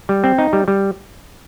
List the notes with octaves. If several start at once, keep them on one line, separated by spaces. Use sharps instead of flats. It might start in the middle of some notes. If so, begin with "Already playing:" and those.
G3
C4
D#4
G3
G3